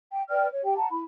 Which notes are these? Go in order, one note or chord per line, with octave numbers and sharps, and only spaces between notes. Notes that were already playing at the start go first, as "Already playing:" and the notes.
G5
B4 D5 G5 F6
C#5
G4 G5
F#5 A5 A#5
E4 B5